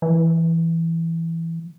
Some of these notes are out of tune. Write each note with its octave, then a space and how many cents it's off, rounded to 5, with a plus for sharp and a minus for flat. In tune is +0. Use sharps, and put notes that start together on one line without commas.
E3 +5